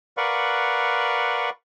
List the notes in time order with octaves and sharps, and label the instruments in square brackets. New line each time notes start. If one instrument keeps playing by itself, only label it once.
[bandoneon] A#4 B4 D5 F5 F#5 C#6